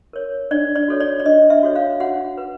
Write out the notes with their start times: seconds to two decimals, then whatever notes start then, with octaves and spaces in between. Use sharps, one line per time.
0.13 A#4 C#5
0.51 D4 D5
0.76 D5
0.88 F#4 A4 C#5
1.00 D5
1.20 D5
1.25 D4 D#5
1.50 E5
1.63 F#4 A4 C#5
1.76 F5
2.00 F#4 F#5
2.38 B4